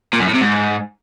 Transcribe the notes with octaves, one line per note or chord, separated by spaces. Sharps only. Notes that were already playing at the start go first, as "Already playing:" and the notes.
A#2
F#2
A2
C3
G#2